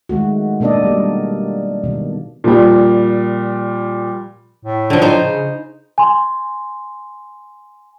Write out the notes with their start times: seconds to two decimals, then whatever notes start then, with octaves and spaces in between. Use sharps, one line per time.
0.09 D#3 G#3 A3 F#4
0.60 B2 A#3 D4 A4 D5 D#5
0.83 G3 A#3
1.84 B2 D#3
2.44 A#2 F3 G3
4.65 A2
4.90 D3 F3
5.02 D#4 C5
5.21 C#3
5.98 G#5 C6